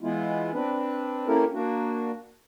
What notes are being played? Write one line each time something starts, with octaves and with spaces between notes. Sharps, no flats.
E3 G#3 B3 E4 F4
C4 D4 B4
A#3 C#4 E4 G4 A4 A#4
A#3 D4 F#4